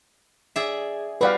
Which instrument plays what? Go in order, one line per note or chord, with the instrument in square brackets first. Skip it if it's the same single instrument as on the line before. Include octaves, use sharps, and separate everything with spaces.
[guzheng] G#4 D5 E5
[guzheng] G3 F#4 [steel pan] B4 D5 F5